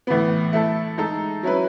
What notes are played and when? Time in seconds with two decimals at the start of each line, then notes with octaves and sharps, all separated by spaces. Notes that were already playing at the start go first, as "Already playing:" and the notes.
0.07 A2 E3 B3
0.53 A3 E4 A4
0.98 G#3 D#4 A4
1.43 F#3 C#4 E4 B4